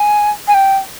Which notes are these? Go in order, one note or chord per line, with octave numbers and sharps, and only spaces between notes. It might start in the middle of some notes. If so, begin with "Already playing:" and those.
Already playing: G#5
G#5
G5